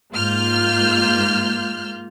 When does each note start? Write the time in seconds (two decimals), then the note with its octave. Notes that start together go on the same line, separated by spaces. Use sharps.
0.13 G#2 A#3 F4 F6 G6